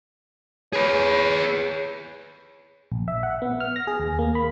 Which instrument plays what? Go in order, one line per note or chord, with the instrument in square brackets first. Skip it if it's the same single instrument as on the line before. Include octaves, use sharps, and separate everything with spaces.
[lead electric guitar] G#4 B4 [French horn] C#5
[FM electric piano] A#1
E5
F#5
B3
F6
A#6
G#4
D#2
A#3
B5